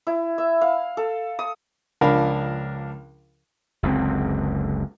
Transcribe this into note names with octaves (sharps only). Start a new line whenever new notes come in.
E4
E5
F5
A4
D#6
C#2 F3 D4 A#4 F5 B5
F#1 C#2 D3 C4